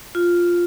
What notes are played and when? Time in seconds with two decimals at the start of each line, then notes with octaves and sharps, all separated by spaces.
0.15 F4